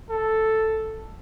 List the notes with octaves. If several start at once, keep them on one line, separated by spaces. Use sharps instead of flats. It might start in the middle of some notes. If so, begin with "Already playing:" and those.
A4